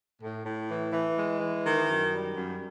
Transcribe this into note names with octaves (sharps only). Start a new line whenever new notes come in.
A2
A2
E3
E3
G#3
E3
D#3
F#2
G3
F#2